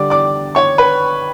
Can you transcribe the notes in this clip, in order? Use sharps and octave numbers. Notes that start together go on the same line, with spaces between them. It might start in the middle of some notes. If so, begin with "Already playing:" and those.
Already playing: D3 G3 D5 D6
D5 D6
C#5 C#6
B4 B5